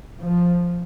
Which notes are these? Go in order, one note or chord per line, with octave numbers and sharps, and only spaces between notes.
F3